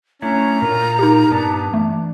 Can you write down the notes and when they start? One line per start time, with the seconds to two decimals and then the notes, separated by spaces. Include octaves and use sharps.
0.22 A3 C#4 D4 E4 A#5
0.62 A#2 F4 A#4
0.99 D#4 G4 A#4
1.31 G2 B3 D4 A5
1.73 E3 A3